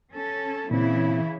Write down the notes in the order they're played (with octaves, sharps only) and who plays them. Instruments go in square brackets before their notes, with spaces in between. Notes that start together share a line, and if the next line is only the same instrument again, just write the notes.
[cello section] C#4 A4
[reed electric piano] A#2 C4 [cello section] C#3 E3 E4